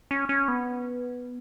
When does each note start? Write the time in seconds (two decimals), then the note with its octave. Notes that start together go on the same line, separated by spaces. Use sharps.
0.11 C#4
0.29 C#4
0.48 B3